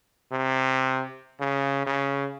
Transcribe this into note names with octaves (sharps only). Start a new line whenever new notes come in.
C3
C#3
C#3